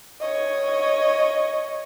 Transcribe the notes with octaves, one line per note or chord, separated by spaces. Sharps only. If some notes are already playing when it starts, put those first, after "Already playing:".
C#5 D#5